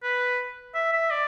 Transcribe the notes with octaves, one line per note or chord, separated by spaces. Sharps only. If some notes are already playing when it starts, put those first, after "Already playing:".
B4
E5
E5
D5